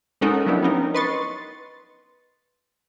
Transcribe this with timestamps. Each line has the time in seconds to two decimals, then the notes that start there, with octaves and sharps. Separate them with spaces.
0.21 G#3 C#4 D#4 F#4 A4 A#4
0.46 F3 F#3 B3 D4 E4 G4
0.62 B3 C#4 D#4 A#4
0.94 B4 D#5 C6 C#6 A6